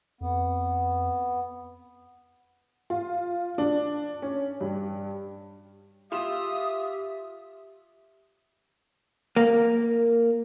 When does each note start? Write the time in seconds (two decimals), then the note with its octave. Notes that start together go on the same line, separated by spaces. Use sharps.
0.21 F2 B3
2.90 F4
3.58 D4
4.22 C#4
4.61 G2
6.12 F4 G4 E5 C6 D#6 E7
9.36 A#3